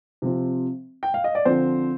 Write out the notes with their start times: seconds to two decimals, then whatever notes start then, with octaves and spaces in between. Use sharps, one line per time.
0.22 C3 F3 C4
1.03 G5
1.14 F5
1.24 D#5
1.35 D5
1.45 D3 F3 C4 C5